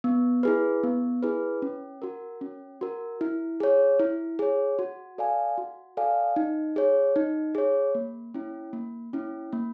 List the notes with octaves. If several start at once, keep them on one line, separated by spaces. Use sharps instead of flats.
B3
E4 G#4 B4
B3
E4 G#4 B4
C#4
F#4 A#4
C#4
F#4 A#4
E4
G#4 C#5
E4
G#4 C#5
F#4
A4 D5 F5 G#5
F#4
A4 D5 F5 G#5
D#4
G#4 C#5
D#4
G#4 C#5
A#3
C#4 E4
A#3
C#4 E4
A#3